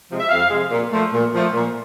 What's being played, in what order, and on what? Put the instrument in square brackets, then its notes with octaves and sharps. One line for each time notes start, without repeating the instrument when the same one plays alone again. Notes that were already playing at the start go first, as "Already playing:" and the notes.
[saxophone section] C3 F3 G#3
E5
F2 F5
C3 F3 G#3
A#2
F3 A3
A#2
F3 A3
A#2